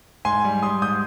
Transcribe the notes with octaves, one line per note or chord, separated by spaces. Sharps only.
G#2 G#5 C6
G3
G3 C6 D#6
G#2 D#6 G6